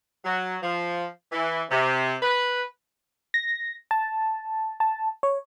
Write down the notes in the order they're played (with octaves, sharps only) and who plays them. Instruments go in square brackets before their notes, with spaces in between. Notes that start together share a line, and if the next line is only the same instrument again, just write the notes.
[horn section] F#3
F3
E3
C3
B4
[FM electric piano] A#6
A5
A5
C#5